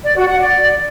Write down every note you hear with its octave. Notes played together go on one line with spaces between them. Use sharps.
D5
F#4
F#5
D5